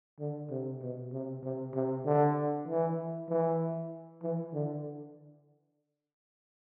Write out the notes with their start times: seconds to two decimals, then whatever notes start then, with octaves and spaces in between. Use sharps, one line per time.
0.20 D3
0.51 C3
0.82 B2
1.13 C3
1.43 C3
1.75 C3
2.05 D3
2.68 E3
3.29 E3
4.23 E3
4.54 D3